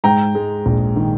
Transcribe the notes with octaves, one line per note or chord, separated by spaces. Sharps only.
G#2 G5 A#5
G#3
A#1
D#3